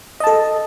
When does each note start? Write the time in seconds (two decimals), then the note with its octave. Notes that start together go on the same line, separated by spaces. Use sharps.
0.20 D#5
0.24 A5
0.27 A4